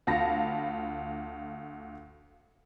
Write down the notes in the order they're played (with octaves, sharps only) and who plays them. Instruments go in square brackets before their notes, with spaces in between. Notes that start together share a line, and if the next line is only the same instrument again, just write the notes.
[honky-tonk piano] D2 F4 F5 A5 B5 A#6